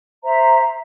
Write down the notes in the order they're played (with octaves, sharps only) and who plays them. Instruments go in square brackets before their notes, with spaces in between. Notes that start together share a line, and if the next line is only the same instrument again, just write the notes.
[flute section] C5 E5 A#5